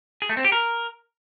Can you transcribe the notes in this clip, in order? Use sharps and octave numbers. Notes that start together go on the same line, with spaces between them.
G#4
A3
C4
G4
A#4